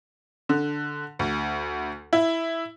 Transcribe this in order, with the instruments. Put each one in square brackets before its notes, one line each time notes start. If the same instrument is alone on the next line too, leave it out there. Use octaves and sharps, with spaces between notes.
[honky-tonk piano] D3
D2
E4